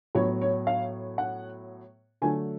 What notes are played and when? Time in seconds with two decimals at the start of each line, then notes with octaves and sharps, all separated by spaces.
0.15 A2 F#3 B3 C#5
0.42 C#5
0.67 F5
1.18 F#5
2.22 D3 F#3 A3 G#5